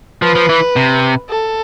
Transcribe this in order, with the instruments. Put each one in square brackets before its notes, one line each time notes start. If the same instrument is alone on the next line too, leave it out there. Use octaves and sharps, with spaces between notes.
[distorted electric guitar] F3 [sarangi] B4
[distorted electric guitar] F3
E3
C3
[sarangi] A4